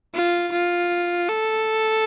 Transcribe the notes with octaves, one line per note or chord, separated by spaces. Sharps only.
F4
F4
A4